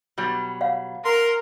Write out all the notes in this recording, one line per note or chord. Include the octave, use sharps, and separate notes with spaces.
B2 F#3 G3
C#5 F5 F#5
A#4 C6